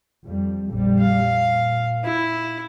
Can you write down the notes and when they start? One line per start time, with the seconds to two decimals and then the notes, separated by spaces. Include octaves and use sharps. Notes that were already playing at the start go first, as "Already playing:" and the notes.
0.24 F2 G3
0.71 A#1 F2 G3
1.00 F5
1.46 A#2
2.04 E4